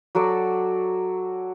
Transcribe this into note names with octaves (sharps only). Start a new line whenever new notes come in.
F#3 F#4 A4 D5